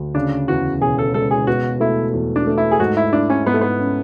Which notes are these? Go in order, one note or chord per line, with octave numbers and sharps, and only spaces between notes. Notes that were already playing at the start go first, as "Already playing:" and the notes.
Already playing: D2
C#3 D4
E2 F#4
E1 G#4
A4
G#3 A4
G#4
B2 F#4
A3 E4
E2
D4
A3
E4
G#4
G#2 F#4
E4
D4 E4
C#4
G#2 B3
A3
B3
C#4